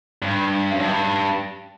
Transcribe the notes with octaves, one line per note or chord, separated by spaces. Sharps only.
G2
F#2
G2